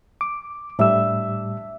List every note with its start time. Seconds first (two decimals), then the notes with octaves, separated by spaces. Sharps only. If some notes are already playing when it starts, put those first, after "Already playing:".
0.21 D6
0.79 A2 G3 D4 E5 E6